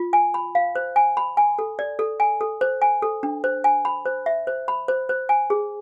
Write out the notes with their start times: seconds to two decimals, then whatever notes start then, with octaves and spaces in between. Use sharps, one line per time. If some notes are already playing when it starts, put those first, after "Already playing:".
Already playing: F4
0.13 G#5
0.34 B5
0.55 F5
0.75 C5
0.96 G#5
1.17 B5
1.37 G#5
1.59 A4
1.79 D5
1.99 A4
2.20 G#5
2.41 A4
2.61 C5
2.82 G#5
3.02 A4
3.23 D4
3.44 C5
3.64 G#5
3.85 B5
4.06 C5
4.26 E5
4.47 C5
4.68 B5
4.88 C5
5.09 C5
5.29 G#5
5.50 G#4